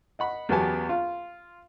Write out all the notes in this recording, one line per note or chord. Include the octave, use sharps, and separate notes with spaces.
D#5 F#5 B5
E2 F#3 B3 G4 G#5 A5
F4